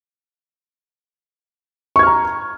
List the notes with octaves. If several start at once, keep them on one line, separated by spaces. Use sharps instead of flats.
A#5 C#6 F6 G#6